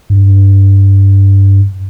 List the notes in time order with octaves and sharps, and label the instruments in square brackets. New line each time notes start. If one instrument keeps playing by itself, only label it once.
[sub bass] G2